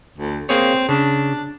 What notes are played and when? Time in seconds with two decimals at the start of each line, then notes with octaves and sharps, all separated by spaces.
0.18 D2
0.49 A#3 C4 G#4 C#5
0.89 C#3 D4